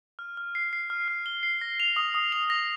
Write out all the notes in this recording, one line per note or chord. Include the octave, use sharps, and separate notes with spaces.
F6
F6
C7
C7
F6
F6
G7
C7
A#6
F7
D#6
D#6
F7
A#6